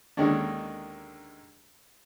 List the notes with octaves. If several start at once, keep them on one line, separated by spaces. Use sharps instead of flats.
D#2 D3 D#3 G#3 C#4 D4